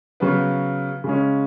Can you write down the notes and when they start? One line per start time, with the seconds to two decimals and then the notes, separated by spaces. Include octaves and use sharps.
0.20 C#3 F#3 B3
1.04 C#3 G#3 C#4